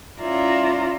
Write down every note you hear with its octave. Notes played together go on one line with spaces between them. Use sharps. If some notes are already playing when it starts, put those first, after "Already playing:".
C#4 E4 F4 D5 E5 A#5